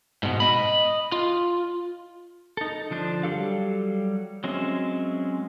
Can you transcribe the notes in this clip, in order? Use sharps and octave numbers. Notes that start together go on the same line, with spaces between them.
G#2 B2
D#5 B5
F4
D#4 A4
D3 F3 D4 G6
F#3 G3 G4 A4 F5
F#3 G#3 C4 C#4 E5